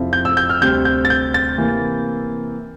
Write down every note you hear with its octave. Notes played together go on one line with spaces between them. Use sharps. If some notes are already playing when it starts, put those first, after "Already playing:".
Already playing: F2 C3 F3 C4 E4
G6
E6
G6
F6
D2 C3 G3 C4 G6
G6
A6
G6
A6
C3 E3 A#3